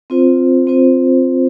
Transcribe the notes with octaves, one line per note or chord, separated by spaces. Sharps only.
C4 F4 C5
C4 F4 C5